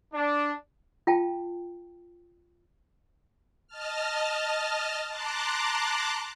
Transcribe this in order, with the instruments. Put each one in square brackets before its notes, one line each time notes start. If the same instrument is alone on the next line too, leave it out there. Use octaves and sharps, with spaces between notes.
[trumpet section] D4
[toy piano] F4 F5 G5 A5
[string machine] D#5 A5 F6
A5 A#5 C6 D6 F#6